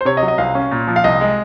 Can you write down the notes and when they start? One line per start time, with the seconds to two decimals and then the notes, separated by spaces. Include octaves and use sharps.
0.01 C5
0.05 C3 C#5
0.17 D#5
0.23 F#3
0.28 D#5
0.38 C2 F5
0.55 C#4
0.71 A#2
0.88 F3
0.96 F5
1.04 C2 D#5
1.21 G#3